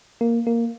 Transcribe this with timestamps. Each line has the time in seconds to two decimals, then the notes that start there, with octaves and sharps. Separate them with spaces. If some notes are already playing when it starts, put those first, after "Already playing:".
0.21 A#3
0.47 A#3